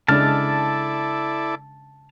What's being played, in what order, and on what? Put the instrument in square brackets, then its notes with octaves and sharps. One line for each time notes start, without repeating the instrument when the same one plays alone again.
[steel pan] C#3 G#3 D4 [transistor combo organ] E4 A4 D5 [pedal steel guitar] A5 F6